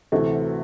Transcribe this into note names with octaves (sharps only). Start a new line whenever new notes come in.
D2 C3 E3 A3